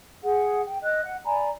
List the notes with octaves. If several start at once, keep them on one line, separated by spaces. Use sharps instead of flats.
G#4 F#5
G5
D#5 F#6
F#5
D5 G#5 A#5 B5